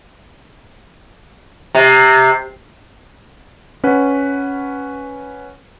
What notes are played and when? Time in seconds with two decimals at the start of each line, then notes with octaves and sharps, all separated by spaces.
1.75 C3
3.84 C#4 B4 F#5